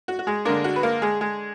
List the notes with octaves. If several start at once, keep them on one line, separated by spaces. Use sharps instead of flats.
F#4
F#4
G#3 G#4
D3 G#3 A#3 D4 A#4
F#4
B4
A#3 A#4
G#3 G#4
G#3 G#4